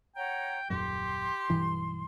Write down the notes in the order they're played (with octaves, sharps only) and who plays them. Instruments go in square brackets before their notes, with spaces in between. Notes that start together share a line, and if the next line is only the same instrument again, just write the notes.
[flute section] C#5 F#5 A#5 [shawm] G5
[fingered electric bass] D#1 F#2 [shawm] G4 [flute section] C6
[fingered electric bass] B1 G2 E3